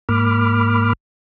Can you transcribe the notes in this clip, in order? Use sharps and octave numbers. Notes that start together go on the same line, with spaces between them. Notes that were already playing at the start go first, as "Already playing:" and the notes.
G#2 A#3 B5 D6 F6